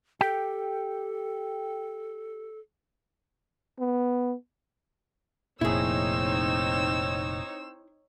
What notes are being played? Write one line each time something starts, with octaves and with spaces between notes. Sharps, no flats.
G4 A4 G5
B3
F1 A#2 C4 D#4 E4 G#4 C#5 E6